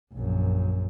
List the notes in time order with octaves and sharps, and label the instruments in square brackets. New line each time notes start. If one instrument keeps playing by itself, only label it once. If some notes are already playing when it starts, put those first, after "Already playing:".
[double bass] A#1 F#2